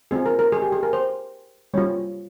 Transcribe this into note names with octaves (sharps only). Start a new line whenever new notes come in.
C4 F4 G#4
A#4
A#4
G#4
G4
G#4
A#4
C5
G3 C#4 F4 C#5